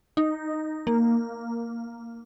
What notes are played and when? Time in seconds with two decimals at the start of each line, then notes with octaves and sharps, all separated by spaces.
0.17 D#4
0.87 A#3